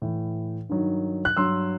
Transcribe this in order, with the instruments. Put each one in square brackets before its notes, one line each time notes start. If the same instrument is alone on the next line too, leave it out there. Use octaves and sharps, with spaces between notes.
[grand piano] A2 E3
G2 D#3 F#3
F#6
G2 F#3 C6 E6